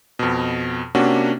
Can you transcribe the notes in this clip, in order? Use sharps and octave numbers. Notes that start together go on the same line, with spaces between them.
F2 B2
C3 A#3 C#4 D4 F#4